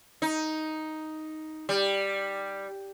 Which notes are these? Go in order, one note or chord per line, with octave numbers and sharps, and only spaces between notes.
D#4
G3